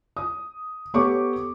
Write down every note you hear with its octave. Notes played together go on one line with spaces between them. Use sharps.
D#6
B3 G4 A4 C#5 C#6 D6